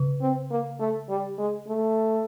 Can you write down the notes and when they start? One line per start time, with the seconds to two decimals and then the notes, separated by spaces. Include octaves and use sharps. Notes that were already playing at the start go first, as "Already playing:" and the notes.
Already playing: C#3
0.21 C4
0.51 A#3
0.80 A3
1.09 G3
1.38 G#3
1.68 A3